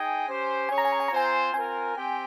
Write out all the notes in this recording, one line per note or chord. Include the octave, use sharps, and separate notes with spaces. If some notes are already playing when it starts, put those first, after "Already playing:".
Already playing: D#4 G#4 D#5 G5 G#5
C#4 G4 C5
C#4 G#4 C#5 G#5
A#5
G#5
A#5
G#5
A#5
C4 F4 C5 G#5
C4 F4 A#4 G#5
C4 G4 C5 G5